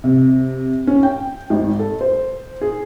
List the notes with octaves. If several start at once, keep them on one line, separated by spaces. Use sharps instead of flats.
C3
C#4
G5
G#1
A4
C5
G#4